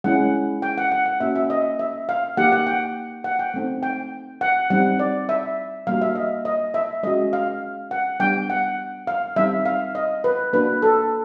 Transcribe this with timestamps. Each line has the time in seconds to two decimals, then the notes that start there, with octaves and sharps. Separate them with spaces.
0.04 G#3 C#4 E4 F#5
0.62 G5
0.78 F#5
0.92 F#5
1.06 F#5
1.20 A#3 C#4 F#4 E5
1.36 E5
1.50 D#5
1.79 E5
2.09 F5
2.37 A#3 D#4 G4 F#5
2.52 F#5
2.67 G5
3.24 F#5
3.39 G5
3.54 A3 C4 D#4
3.83 G5
4.41 F#5
4.70 G3 C4 D#4 F#5
4.99 D5
5.29 E5
5.87 G3 A#3 D4 F#4 F5
6.02 E5
6.15 D#5
6.45 D#5
6.74 E5
7.03 G#3 C#4 F#4 D#5
7.33 F5
7.91 F#5
8.20 G3 B3 D4 G5
8.50 F#5
9.07 F5
9.36 G3 C4 D#4 E5
9.65 F5
9.95 D#5
10.24 B4
10.53 A#3 D4 F#4 B4
10.82 A4